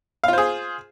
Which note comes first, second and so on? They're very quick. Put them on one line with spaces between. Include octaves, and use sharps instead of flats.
F5 F4 C5 G#4